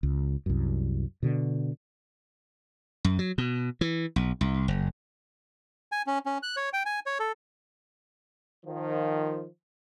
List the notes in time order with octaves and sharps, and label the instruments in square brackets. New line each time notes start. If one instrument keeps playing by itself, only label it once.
[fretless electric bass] C#2
C2 F#2
B2 D3
[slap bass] F#2
F#3
B2
E3
B1
C2
F#1
[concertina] G#5
C#4
C#4
F#6
C#5
G5
G#5
C#5
A4
[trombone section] D#3 F3